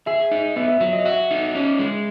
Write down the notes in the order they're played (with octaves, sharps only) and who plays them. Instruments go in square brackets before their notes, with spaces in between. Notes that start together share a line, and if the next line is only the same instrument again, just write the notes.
[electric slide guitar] G#4 [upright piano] E5
[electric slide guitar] D#4
[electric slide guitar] B3 [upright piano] E5
[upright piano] E5
[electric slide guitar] F#3 [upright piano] E5
[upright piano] D#5
[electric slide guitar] F#4 [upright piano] E5
[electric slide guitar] D#4
C#4
G#3